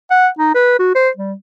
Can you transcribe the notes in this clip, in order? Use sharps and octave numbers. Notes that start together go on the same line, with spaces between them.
F#5
D#4
B4
F#4
C5
G3